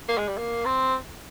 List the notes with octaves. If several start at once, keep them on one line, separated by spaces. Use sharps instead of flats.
A#3
G#3
G3
A#3
C4